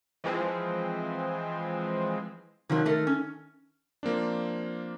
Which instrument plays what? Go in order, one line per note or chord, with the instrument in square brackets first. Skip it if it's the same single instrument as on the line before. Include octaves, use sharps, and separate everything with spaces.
[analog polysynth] E3 F3 G#3 C4
[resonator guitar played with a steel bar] C3 F3 F#3 [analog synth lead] D#3
[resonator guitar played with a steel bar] A3 A4 A#4
C#4
[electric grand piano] F3 A#3 C4 D4